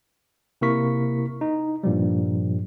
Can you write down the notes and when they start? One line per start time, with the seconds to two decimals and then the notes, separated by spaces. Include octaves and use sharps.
0.61 C3 A#3 E4 A#4 C#6 B6
1.41 D#4
1.83 G2 A#2 F3 G3